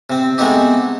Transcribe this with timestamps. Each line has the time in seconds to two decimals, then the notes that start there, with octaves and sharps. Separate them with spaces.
0.10 C3 C4
0.38 G#3 A3 B3 C4 D#4 G4